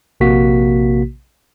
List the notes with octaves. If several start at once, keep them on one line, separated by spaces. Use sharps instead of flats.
A#1 C3 A#3 F#4 B6